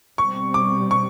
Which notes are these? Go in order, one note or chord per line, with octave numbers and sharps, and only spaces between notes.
B2 G3 C4 C#6
D6
C#6